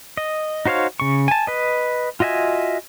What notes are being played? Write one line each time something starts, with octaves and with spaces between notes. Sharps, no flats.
D#5
D#4 F#4 C5 C#5 F5
C#3 C#6
G#5 A5
B4 D#5
F4 F#4 D#5 E5 G#5